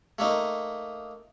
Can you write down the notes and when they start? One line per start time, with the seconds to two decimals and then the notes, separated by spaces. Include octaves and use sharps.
0.19 A3 A#3 D#4